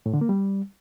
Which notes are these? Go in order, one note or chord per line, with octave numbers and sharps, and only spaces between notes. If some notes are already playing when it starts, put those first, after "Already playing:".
A2
D3
A#3
G3